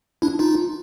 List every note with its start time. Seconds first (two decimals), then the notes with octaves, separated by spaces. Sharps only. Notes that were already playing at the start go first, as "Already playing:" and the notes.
0.22 D4 E4
0.39 D#4 F4